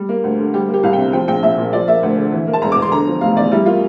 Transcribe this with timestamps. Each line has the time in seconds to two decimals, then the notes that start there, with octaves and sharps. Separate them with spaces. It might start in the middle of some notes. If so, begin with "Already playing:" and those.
Already playing: G3
0.09 A#3
0.24 D2
0.39 D3
0.54 G3 G4
0.68 A#3
0.74 G4
0.83 C2 F5
0.93 G5
0.98 C3
1.13 F3 G5
1.28 A#1 G5
1.43 A#1 E5
1.58 A#2
1.73 F3 D5
1.88 A#3 E5
2.03 D2
2.17 D3
2.32 E3
2.47 A#3
2.53 A5
2.62 E1 A#5
2.72 D6
2.77 E2
2.82 C6
2.92 D3 A#5
3.07 F3
3.21 F1 F5
3.36 E2 D5
3.52 G3 E4
3.66 A#3 F4